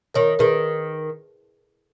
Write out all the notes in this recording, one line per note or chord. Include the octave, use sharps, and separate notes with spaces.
D#3 A#4 C#5
D#3 G#4 B4